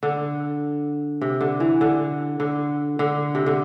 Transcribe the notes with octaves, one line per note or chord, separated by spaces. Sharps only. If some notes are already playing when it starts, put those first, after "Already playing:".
D3
C3
D3
E3
D3
D3
D3
C3
D3